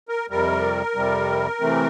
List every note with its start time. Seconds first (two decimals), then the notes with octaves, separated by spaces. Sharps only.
0.09 A#4
0.30 F2 C3 G3 A#4
0.95 F2 C3 G3
1.61 C3 E3 A3 C4